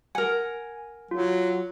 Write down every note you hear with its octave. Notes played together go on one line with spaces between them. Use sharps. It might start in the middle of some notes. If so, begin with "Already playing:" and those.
A#4 F#5 G#5
F#3 F4